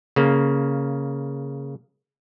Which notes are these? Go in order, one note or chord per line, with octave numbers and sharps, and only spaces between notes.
C#3 A#3